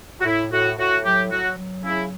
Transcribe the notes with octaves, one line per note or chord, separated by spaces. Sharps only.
F#4
A2 E4
A2 F#4
A2 F#4
F#3 G4
F#3 F#4
F#3
C#3 E4